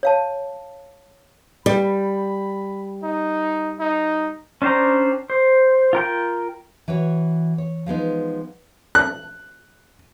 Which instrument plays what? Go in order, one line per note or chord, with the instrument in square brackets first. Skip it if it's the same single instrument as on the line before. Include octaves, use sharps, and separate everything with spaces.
[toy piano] C#5 F5 A5
[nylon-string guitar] G3 [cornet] B5
[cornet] D#4
D#4
[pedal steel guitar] C#4 D4 C5 G5 A#5
C5
F4 A#4 G5
[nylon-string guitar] E3 E4 F#4 C#5
C#5
F3 G#3 B3 D#4
[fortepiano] F#6